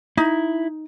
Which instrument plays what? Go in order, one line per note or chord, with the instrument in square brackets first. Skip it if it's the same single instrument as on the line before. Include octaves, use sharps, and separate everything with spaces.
[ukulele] D#4 [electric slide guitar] E4